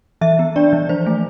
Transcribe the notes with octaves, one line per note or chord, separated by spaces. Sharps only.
E3 E5
B3
D4 D5
E3
F3 C5
A3